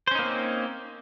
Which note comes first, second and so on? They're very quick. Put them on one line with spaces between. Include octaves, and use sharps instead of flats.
C5 C#4 D#4 A#3 C4